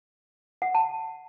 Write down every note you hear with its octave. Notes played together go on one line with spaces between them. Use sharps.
F#5
A5